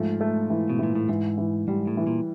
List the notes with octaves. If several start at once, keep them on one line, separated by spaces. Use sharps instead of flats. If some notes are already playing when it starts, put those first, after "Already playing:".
Already playing: G#2 F3 A3
A3
E3
B2
A#2 E3
A2
G#2 E3
E3
G#2 G3
A2
E3
A#2